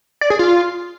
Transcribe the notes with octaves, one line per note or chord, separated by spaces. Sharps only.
D5
G#4
F4